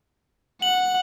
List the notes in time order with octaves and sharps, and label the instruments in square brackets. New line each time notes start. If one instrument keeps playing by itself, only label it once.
[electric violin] F#5 [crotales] F#7